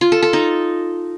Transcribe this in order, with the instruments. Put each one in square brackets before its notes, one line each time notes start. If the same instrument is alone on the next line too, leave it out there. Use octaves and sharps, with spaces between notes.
[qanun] F4
A4
A4
D#4